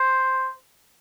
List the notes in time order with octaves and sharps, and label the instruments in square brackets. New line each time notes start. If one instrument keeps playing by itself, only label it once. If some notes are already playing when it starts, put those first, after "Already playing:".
Already playing: [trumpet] C5